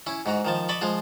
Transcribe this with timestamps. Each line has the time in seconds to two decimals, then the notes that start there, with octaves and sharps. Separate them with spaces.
0.07 C#4 E4
0.26 G#2 F#4 A#5
0.45 D#3 F3 A5
0.69 D5 D#5 A5 B5 C#6
0.81 F3 G#3 F4